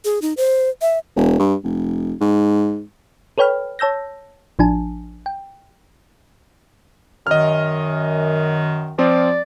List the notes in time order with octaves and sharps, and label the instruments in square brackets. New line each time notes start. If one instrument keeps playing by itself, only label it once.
[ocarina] G#4
D#4
C5
E5
[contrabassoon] E1
G2
F1
G#2
[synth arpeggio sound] A4 B4 C#5 G5 B5 F6
C#5 A5 E6 G6 A#6
A1 F3 D4 G#5 A5
G5
[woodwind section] F#2 D#3 [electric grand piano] D#5 F6
[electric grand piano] F3 C4 F4 [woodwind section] D5